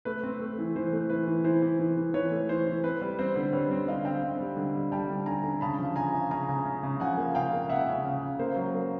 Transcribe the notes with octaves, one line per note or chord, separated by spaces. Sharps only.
A3 B4
C4
A3
E3
E3 C5
A3
E3 B4
E3
E3 C5
E3
E3
E3
E3 B4 C#5
A3
E3 C5
E3
C4 B4
G3
C4 C5
D3
G3 B4 C#5
C4
D3 D#5 F5
C4 F5 G5
C4
G3
D3
G3
G3 G5 A5
D3
D3 G#5 A#5
D3
C#3 A5 B5
F3
C#3 G#5 A#5
C#3
C#3 G#5 A#5
C#3
C#3
C#3
F3 F#5 G#5
A#3
C#3 F5 G5
A#3
C#3 E5 F#5
C#3
C#3
C#3
A#3 C5
F#3
A#3